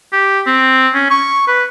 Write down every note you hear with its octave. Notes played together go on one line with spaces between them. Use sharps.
G4
C4
C#4
C#6
B4